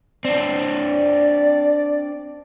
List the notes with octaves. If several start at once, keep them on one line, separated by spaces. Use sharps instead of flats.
C4 D4 D5